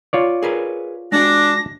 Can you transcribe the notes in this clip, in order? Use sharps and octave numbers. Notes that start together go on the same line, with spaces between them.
F4 C#5 D5
G#4 A#4 B4
G#3 D4 F#4 A#6